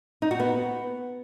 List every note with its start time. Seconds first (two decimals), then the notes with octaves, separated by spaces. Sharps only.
0.22 D#4
0.31 F#4
0.40 B3